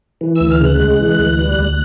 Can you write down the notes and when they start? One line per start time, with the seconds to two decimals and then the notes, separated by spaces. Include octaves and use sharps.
0.21 E3
0.36 E6
0.41 D2
0.51 F6
0.61 C#3 F#6
0.80 G#3
0.99 E3
1.19 D2
1.39 G3
1.59 D2